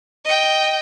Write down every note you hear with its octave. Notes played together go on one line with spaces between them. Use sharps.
D#5 G5